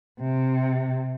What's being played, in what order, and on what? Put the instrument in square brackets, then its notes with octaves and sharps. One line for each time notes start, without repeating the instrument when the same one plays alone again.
[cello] C3